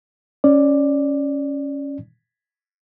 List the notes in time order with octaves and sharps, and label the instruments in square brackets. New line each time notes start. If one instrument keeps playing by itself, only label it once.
[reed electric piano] C#4 D5